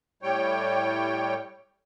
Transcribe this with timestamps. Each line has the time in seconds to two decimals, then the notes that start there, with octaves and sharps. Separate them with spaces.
0.23 A2 G3 C#5 G5